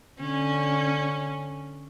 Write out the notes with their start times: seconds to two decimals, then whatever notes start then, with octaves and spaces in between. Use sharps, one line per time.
0.20 D3 C#4